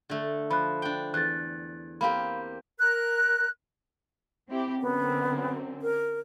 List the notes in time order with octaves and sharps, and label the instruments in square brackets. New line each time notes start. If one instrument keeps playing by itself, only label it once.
[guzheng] D3 A3
[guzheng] F3 [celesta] B5 F#6
[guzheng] D4 G5
[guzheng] E2 [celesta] F#6 A6
[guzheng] A#3 C4 G4 [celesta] F5 B5
[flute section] A#4 F#6
[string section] C4 E4 G4
[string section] F#2 D3 C4 [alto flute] B3
[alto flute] A#4